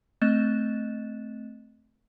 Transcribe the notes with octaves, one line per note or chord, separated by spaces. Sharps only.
A3 C4 D#5 F#6 A6 E7